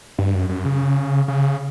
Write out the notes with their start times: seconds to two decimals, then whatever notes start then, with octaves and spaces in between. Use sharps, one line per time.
0.19 G2
0.35 F#2
0.49 F#2
0.65 C#3
1.28 C#3